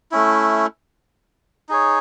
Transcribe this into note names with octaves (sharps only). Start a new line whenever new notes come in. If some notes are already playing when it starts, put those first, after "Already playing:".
A3 C#4 E4
D#4 G#4 C#5